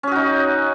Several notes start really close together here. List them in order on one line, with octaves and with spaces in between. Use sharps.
C#4 G#4 F#4 D#4